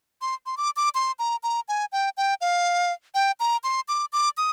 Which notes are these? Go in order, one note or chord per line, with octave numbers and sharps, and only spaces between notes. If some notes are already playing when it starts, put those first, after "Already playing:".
C6
C6
D6
D6
C6
A#5
A#5
G#5
G5
G5
F5
G5
A#5
C6
D6
D6
D#6